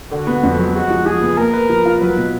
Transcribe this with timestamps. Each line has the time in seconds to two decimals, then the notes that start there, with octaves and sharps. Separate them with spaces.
0.11 D3 F#4
0.27 B3
0.43 F2
0.59 F#3
0.74 G#3 F#4
0.90 F3
1.06 F3 G#4
1.22 B3
1.37 A#3 A#4
1.53 B4
1.69 F3
1.85 F4
2.01 F#3 B4
2.17 B2